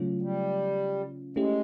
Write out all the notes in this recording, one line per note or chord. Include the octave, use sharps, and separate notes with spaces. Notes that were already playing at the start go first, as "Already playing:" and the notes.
Already playing: C#3 F#3 A3 C#4 F4
G3
G#3 A3 C#4 E4 G4